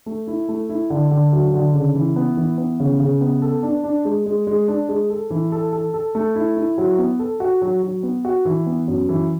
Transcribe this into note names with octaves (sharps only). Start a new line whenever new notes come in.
A3
E4
A3
E4
D3
D3
F#3
D3
C#3
E3
B3
E3
B3
C#3
C#3
B3
A4
D4
D4
G#3
G#3
G#3
D4
G#3
A4
E3
A4
A4
A4
A3
E4
E4
F#3
B3
A4
F#4
F#3
F#3
B3
F#4
E3
B3
F#2
E3